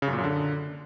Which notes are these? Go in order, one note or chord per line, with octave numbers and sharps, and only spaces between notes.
C#3
F#2
A#2
F#2
D3